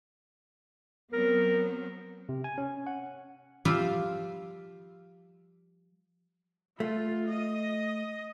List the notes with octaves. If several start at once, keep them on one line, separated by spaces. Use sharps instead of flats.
F#3 B3 C4 A#4
C3
G#5
C#4
F#5
F3 G3 F4 C5 D5 E5
A3 F4
D#5